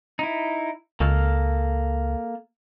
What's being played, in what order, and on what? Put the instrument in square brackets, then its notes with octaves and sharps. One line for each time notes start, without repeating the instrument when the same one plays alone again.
[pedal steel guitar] D#4 E4
[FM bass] C#2 [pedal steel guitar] A#3 A4 F6